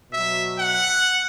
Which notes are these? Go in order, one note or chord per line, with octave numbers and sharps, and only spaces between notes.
B2 F#3 E5
F#5